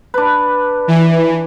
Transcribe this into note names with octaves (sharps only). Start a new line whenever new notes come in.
D4 B4
E3